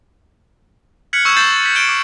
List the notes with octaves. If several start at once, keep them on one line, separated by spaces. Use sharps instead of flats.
F6 F#6 G#6 B6 C#7 F#7
C#6 E6 G6 G#6 E7
G6 A6 C7 E7 F#7
B6 F#7
G6 C#7 D7 E7 G7
D6